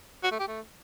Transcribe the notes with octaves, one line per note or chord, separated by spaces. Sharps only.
F#4
A3
G4
A3